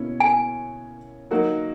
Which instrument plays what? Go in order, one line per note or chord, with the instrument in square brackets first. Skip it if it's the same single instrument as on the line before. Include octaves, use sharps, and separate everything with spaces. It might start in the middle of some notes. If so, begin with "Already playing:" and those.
Already playing: [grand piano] B2 A#3 C#4 E4
[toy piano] G#5
[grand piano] F#3 A#3 D#4 F#4 A#4